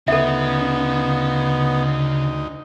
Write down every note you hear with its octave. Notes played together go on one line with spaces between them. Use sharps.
D2 C#3 B3 D#4 A4 E5